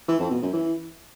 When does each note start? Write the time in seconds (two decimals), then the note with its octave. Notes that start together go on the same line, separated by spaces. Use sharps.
0.08 E3
0.19 F2
0.30 B2
0.42 F#2
0.53 E3